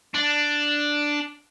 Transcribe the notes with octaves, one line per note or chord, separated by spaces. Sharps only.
D4